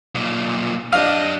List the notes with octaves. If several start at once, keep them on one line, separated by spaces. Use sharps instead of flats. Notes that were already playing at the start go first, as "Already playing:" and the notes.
B1 A#2
F#2 D4 G4 D#5 F5